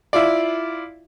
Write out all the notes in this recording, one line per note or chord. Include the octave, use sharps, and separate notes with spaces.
E4 F4 D5